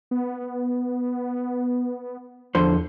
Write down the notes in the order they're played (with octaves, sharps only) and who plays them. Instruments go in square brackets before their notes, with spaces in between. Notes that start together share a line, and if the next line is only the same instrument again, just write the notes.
[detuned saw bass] B3
[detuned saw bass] E2 [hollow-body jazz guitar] D3 F3 C5